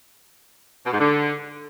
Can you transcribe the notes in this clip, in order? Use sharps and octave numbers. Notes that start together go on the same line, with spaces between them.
B2
G#2
D3